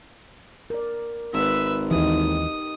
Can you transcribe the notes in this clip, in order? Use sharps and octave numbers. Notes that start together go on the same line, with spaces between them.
A#4 D5
G#1 B4 E5
D#2 E3 D#4 G4 D#6